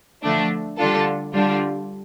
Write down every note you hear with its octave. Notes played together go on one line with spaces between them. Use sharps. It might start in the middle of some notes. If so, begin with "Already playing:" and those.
D3 F3 A3 D4
D3 G3 D4 F4 A4
D3 G3 D4 F4